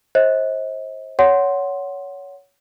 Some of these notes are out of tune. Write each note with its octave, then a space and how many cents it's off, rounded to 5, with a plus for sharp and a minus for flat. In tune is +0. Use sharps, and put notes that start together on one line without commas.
C5 +25 D#5 +40
C#5 +20 F#5 +0 C6 +0